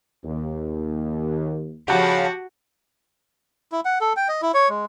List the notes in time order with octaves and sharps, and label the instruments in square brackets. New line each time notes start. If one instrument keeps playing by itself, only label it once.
[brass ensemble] D#2
[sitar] C#3 F3 [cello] F#4 [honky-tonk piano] G4 F#5 A5
[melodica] E4
F#5
A4
G5
D#5
E4
C#5
G#3